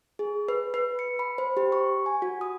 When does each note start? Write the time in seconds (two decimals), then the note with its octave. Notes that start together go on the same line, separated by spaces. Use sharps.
0.19 G#4
0.48 B4
0.74 B4
0.99 C#7
1.19 B5
1.38 C5
1.57 G4
1.72 C#6
2.06 G#5
2.22 F#4
2.41 D#6